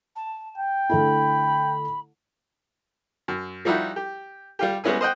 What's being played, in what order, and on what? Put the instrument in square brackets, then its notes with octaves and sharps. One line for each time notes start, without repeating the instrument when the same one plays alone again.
[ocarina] A5
[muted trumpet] G5
[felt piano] D3 A3 E4 [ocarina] B5
[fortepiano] F#2
F3 G3 D#4 E4 F#4 G4
G4
G3 F4 G4
G3 G#3 B3 C#4 E4 G#4
C5 D#5 F#5 G5